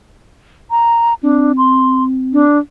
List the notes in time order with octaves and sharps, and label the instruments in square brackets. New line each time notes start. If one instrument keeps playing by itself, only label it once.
[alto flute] A#5
[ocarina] C4 [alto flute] D4
[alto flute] C6
D4